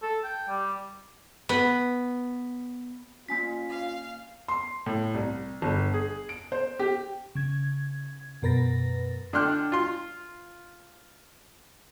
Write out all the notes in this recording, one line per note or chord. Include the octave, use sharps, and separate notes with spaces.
A4
G5
G3
B3
A#3 C#4 F4 G#5 B6
F5
C6
A2
C2
G1
G#4
D7
C5
G4
C#3 G#6
F#2 B2 A#4 B4 A6 A#6
D3 D4 G5 C6 F6 F#6
F4 C6